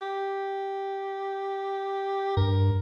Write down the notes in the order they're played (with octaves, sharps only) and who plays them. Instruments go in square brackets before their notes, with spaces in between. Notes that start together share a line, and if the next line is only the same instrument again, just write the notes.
[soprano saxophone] G4
[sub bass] G2 [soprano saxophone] A#4